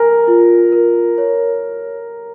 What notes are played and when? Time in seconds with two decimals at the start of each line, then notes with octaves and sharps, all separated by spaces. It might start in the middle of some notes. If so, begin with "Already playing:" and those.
Already playing: A#4 G#5
0.28 F4
0.72 A#4
1.18 C#5